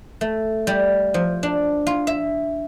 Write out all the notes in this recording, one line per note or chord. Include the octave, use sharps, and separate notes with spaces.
A3
G3
F3
D4
F4
E5